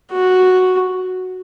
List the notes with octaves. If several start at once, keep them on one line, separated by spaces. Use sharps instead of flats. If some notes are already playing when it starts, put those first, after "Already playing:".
F#4